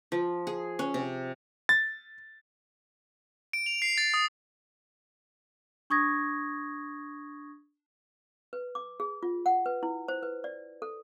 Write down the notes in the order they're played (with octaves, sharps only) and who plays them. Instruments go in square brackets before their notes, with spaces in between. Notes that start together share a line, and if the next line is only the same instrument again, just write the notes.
[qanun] F3
G#4
C#4
C3
[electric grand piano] A6
[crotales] D7
F7
C7
A6
D#6
[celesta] D4 C#6 D#6 G#6 A#6
[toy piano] B4
D6
G#4
F4
F#5
B4
E4
C5
B4
D5
A4